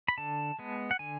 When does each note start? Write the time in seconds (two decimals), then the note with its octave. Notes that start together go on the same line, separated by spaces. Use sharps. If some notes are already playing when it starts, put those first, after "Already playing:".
0.08 B5
0.18 D3 A5
0.59 G#3 B3
0.91 F#5
0.99 D3 G#5